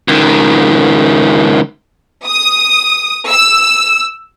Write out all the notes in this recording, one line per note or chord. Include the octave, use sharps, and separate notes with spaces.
C#2 D#3
D#6
E6